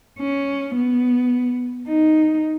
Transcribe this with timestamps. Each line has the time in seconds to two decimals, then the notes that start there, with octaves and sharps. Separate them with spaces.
0.19 C#4
0.76 B3
1.87 D#4